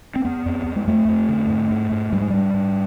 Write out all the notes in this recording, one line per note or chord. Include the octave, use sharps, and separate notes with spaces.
C4
F2 B3
F2
F2
G#3
F2 A3
F2
D3
G#2
G#2
G#2
G#2 G3
G#3
G#2 G3
G#2